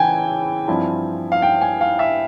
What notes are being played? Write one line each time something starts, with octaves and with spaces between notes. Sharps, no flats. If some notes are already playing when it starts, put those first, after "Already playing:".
Already playing: C#3 E3 E4 G5 G#5
G2 F3 C4 E4
F5
G5
G#5
F5
E5